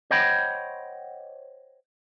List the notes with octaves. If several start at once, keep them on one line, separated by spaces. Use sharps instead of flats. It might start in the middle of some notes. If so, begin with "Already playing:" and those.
C5 C#5 D#5 F#5 G5 B5